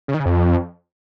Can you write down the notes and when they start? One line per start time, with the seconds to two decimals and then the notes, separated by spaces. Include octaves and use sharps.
0.08 C#3
0.14 D#3
0.20 C#3
0.26 F2